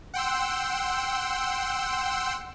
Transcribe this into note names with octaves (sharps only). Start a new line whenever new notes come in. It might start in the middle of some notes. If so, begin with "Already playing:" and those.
F#5 G5 C6 E6